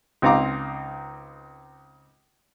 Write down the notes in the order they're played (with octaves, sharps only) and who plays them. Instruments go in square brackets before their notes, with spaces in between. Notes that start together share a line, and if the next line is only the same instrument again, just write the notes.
[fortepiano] C#2 C4 D#4 F5 A#5 D6